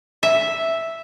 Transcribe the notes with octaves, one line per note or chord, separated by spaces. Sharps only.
E5